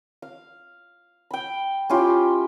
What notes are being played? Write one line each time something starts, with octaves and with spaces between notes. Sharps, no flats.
F5
G5 B5
C#4 E4 F4 G4